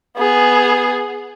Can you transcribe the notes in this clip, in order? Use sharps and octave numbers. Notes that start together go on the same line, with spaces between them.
B3 G#4